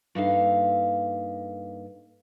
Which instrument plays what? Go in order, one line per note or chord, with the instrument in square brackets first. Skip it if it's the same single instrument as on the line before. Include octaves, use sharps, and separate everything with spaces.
[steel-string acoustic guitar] G2 A#3 D#4 A4 E5 F5